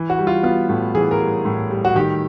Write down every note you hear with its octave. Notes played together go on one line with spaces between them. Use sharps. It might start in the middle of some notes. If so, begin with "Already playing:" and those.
Already playing: E3
F#4
G3
F4
B3 F4
A2
E3 G#4
A#4
G3
A2
G3
F#4
D#3 G4